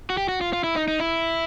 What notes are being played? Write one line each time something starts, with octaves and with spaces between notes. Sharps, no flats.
F#4
G4
F#4
F4
F4
E4
D#4
D#4
E4